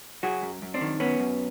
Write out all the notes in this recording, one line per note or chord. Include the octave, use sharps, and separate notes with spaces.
F#3 F#4 G#4
F#2
F#2
C4 D4
D#3
F#2 B3 C#4
F#2